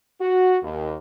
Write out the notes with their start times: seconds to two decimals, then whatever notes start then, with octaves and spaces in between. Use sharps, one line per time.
0.21 F#4
0.62 D#2